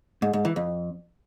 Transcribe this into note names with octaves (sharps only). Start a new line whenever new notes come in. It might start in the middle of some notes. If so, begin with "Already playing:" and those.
G#2
G#2
E3
F2